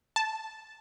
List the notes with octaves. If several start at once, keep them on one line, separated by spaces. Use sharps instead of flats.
A5